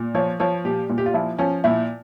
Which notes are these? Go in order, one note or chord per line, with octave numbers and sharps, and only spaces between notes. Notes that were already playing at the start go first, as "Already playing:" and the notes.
Already playing: A#2
F3 C#5
F3 C#5
A#2 G4
A#2
G4
F4
F3 E4
F3 C#4
A#2 E4